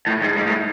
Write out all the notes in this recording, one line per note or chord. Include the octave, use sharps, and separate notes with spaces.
A2
G#2
G#2
A2